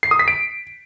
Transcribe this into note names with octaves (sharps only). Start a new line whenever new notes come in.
C7
D#6
B6
D7